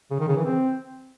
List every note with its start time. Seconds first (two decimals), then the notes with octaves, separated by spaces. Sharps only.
0.11 C#3
0.20 D#3
0.28 C#3
0.37 E3
0.45 C4